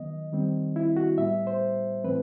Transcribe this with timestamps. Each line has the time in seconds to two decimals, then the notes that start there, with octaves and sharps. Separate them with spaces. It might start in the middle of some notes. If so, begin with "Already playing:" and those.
Already playing: D#3 F#3 B3 D#5
0.32 D#3 G3 C4
0.76 E4
0.96 F#4
1.18 A2 G3 B3 E5
1.47 C5
2.04 A2 E3 A3 C4 B4